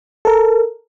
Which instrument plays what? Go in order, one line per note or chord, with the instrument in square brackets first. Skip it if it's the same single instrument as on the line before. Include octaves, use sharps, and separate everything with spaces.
[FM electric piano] A4 A#4